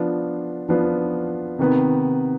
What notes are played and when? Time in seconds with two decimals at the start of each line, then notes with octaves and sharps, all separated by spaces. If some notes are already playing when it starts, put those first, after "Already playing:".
Already playing: F3 B3 D4 F4
0.69 F3 B3 D4 F4
1.59 C3 D#3 B3